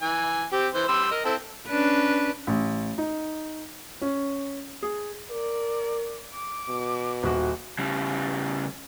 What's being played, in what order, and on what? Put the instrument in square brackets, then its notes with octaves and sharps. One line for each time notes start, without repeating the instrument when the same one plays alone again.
[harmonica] E3 G#5
C4 G4
E3 C5
G3 C6 E6
A#4 D#5
C4 E4 A4
[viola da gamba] C#4 D4 B4
[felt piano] A1
D#4
C#4
G#4
[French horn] A#4 [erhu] D5
[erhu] D6
[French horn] B2
[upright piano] D#1 F#4
[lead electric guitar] C#3 G3